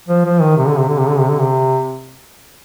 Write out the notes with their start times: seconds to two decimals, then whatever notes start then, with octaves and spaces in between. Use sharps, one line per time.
0.08 F3
0.25 F3
0.41 D#3
0.57 C3
0.67 D3
0.78 C3
0.89 D3
0.98 C3
1.08 D3
1.19 C3
1.29 D3
1.40 C3